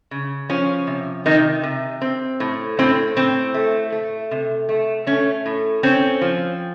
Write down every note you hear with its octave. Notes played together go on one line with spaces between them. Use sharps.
C#3
F3 C#4
C3
C3 D#3 D#4
C3
C4
A2
A2 C4
A2 C4
A3
A3
C3
A3
A3 C#4
A2
C4 C#4
F3